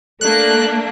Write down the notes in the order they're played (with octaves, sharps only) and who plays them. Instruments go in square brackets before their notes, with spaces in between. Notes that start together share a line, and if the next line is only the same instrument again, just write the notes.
[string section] A3 A#3 D4 [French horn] A4 [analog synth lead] F#6